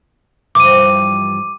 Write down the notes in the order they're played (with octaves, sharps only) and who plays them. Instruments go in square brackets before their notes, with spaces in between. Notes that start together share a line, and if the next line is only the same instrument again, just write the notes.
[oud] G2 E3 F3 [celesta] D6 D#7